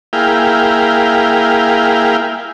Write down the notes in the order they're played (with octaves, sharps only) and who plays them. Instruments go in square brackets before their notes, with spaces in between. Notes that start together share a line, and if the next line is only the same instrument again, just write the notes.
[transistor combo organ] A#3 E4 G#4 F5 G5